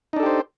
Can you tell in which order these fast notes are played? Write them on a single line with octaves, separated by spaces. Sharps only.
D#4 D4 A4 G4 C5